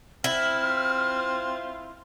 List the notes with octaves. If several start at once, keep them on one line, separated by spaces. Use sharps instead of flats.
C4 E4 F6
F4